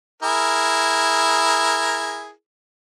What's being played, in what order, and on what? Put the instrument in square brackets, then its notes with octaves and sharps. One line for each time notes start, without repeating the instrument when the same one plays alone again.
[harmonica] E4 G#4 A#4